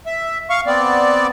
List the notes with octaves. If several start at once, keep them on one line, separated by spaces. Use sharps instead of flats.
E5
F5 C#6
B3 C4 D5